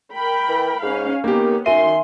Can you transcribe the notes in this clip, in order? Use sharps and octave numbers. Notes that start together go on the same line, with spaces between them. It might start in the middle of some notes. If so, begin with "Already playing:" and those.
A#4 G5 B5
E3
G#2 C#4 F5
D#3 A#3 B3 C#4 G4
F#2 D#3 E5 G#5 C6 D#7